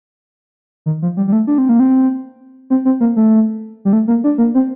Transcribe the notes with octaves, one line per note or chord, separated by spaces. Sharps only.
D#3
F3
G3
G3
A3
D4
C4
A#3
C4
C4
C4
A#3
A3
G3
A3
A#3
D4
A#3
C4